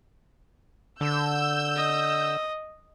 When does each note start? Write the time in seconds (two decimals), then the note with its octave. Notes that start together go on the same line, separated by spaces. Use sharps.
1.01 D3 E6 G6
1.76 D#5